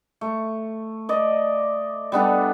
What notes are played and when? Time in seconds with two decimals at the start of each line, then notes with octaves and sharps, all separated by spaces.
0.21 A3
1.09 D5 D#5
2.12 G3 B3 D4 A4